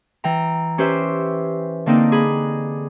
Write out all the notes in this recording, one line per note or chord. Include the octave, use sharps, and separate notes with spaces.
E3 G5 A#5
C#4 G4 B4 C5 E5
D3 A#3 C4 D4 D#4
G#4 B5